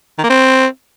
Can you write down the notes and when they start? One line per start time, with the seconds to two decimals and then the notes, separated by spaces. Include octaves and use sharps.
0.18 D#3
0.24 A#3
0.30 C4